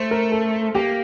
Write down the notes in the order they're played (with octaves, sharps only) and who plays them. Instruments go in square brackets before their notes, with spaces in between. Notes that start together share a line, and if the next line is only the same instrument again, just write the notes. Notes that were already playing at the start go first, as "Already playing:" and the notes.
Already playing: [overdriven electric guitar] A3 [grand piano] C5
[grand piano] A#4
A4
[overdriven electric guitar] A#3 [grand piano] G4